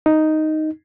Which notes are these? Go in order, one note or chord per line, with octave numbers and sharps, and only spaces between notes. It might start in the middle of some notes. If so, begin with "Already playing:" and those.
D#4